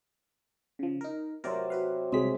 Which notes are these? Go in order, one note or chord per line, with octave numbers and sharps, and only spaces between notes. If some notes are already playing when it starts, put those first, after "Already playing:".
C#3 F3
D#4 A#4
C3 F#3 C4 A#4 C5 D5
F#4 B4 F5
C2 F#3 G#3 C4 G#4 B6